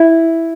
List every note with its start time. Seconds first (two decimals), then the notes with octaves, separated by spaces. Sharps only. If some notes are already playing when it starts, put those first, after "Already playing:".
Already playing: E4